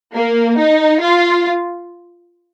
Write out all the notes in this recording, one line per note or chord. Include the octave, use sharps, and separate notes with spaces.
A#3
D#4
F4